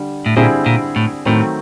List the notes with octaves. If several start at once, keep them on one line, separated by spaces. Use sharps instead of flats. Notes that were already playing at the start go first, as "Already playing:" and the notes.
Already playing: D3 G3
A2
A#2 D3 G3 C4 E4 G#4
A#2
A2
A2 D#3 F#3 A3 C4